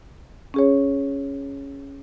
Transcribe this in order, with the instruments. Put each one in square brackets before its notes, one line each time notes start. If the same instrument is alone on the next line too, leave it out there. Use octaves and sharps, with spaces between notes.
[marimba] C#4 G#4 C#5